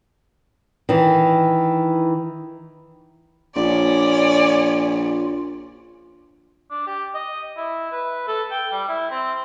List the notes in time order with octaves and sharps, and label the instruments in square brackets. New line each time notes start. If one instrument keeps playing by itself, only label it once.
[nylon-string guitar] D#3 E3
[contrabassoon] A#1 [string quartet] C#4 D5 [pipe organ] F4
[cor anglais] D4
G4
D#5
E4
B4
A4
G5
G3
E4
C4